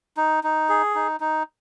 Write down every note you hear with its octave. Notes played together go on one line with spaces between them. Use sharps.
D#4
D#4
G#4
D#4
D#4